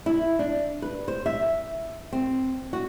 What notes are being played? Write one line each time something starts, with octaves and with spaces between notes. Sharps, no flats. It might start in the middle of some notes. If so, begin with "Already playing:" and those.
E4
D4
B4
C5
E5
C4
F#4